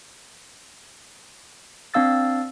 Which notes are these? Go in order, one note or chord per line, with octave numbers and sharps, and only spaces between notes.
C4 D4 F5 E6 A6